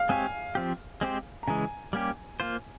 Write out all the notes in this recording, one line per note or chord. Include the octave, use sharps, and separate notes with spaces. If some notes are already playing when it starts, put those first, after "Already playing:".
Already playing: F5
G#3 C4 G4 C#5 G#5
F3 C4 G4
G#3 C4 G4 C5
A#5
C#3 E3 G#3 G#5
G3 A#3 C#4 G4
A#3 F4 C5